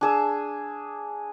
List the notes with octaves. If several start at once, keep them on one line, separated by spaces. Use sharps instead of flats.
D4 G#4 E6